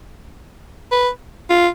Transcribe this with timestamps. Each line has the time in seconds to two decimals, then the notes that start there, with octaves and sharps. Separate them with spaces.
0.91 B4
1.50 F4